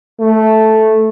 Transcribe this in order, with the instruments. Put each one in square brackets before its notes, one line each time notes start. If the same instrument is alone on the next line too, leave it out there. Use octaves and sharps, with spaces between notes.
[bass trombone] A3